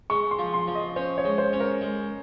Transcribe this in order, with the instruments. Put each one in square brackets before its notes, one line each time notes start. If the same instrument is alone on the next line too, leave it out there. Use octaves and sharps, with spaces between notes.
[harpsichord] G#3 [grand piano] C#6
[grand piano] C6
[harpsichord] F3
[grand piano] C6
[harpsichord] F3
[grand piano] D#5
[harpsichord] C#4 [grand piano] C5
[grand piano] C#5
[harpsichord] G#3
[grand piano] C5
[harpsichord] C#4
[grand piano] A#4
[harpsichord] G#3